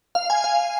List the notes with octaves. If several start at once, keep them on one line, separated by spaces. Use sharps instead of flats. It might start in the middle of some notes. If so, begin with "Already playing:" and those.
F5
G#5
F5